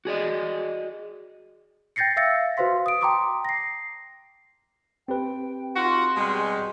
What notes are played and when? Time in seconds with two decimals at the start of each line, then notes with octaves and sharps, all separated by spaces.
0.05 F#4 G#4 D5 D#5
1.96 G5 G6 A6 A#6 C7 C#7
2.17 E5 F5 E6 A6 A#6 C#7
2.57 F#4 B4 C5 F5 C6 B6
2.86 D#6 D7
3.01 G5 A5 A#5 C6 D6 D#6
3.45 A#6 C7
5.08 C4 G4 B4 G5
5.76 D#4 F4 F#4 C6
6.16 B2 G3 G#3